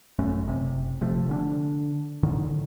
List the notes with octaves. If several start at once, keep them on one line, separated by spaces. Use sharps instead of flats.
G#1 F#2 A3 C#4
F#1 C3
F1 C3 F3 A3
D3 C#4 D4
A2 D3 D#3